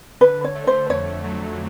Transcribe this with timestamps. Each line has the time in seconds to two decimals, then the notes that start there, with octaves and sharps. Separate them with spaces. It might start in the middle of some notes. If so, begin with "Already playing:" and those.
0.21 D3 B4
0.44 C#5
0.55 A3
0.67 C5
0.90 F2 C#5
1.24 F#3